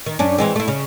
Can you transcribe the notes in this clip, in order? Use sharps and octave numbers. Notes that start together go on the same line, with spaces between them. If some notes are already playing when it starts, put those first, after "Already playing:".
D#3
F#2 C#4 D4
E3 G#3 C4
A3 E4
C#3